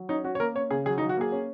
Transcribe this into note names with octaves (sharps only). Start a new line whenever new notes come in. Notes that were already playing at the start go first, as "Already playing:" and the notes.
Already playing: F#3
C#4 D#4
C#4 F#4
C#5
A#3 A#4
C#4 C#5
C#3 G#4
F#3 G#4
D#4
F#3
F#4
A#3 G#4
C#4